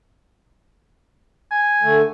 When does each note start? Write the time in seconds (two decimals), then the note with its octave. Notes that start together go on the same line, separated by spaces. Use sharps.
1.51 G#5
1.82 D3 A3